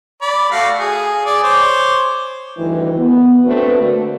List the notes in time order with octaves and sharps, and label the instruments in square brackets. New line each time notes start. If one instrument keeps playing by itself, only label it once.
[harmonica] D5 B5
A3 F#4 F5
G#4
G#4 D5
C5 C#5 D6
[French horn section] D2 G2 D#3 E3
B3
A3 C4 D4 F#4 B4
D3 A3 A#3